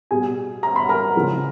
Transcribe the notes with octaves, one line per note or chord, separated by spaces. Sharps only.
B2 G3 G#4 G#5
A#5
B5
A#4 A#5
C#3 F3 G#3